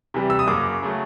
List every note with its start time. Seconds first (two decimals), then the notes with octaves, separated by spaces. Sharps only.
0.14 C3 E3 G3
0.30 E6
0.39 D#6
0.47 F#2 C#3 F#3 A#3 D6
0.83 C#3 F#3 A3